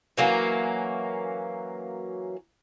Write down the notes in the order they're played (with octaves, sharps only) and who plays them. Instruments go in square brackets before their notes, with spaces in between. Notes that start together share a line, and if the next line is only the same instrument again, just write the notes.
[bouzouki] E3 F#3 A#3 C#4